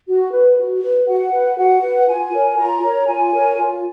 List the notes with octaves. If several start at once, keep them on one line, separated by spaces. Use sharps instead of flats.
F#4
B4
F#4
B4
F#4 F#5
B4
F#4 F#5
B4
F4 G#5
A#4 C#5
F4 A#5
A#4 C#5
F4 G#5
A#4 C#5
F4